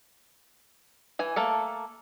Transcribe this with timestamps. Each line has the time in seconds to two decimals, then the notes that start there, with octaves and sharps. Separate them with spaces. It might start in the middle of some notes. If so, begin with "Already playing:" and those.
1.19 E3 G#5
1.36 A3 A#3 A4